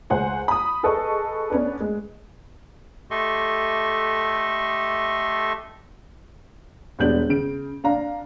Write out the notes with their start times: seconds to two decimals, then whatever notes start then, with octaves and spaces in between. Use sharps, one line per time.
0.10 C#2 C5 F#5 G#5
0.48 B5 D#6
0.83 G#4 A4 B4 D#5 C#6
1.50 B3 C#4 D4 B4
1.81 G#3
3.11 A3 G4 A4 D#5 C6 C#6
6.99 E1 G3 B3 D4 G6 F#7
7.29 C#3 D7
7.84 D4 F5 A#5